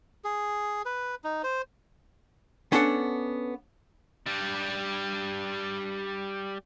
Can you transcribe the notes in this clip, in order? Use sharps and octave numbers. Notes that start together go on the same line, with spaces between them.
G#4
B4
D#4
C5
B3 C#4 D4 E4 A4 F#5
G3 D4